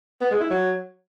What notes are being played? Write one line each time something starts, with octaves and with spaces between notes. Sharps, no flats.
B3
G#3
E4
F#3